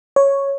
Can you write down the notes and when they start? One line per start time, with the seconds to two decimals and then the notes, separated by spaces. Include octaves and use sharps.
0.16 C#5